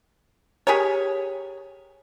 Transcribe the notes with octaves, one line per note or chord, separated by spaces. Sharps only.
G4 G#4 A#4 C#5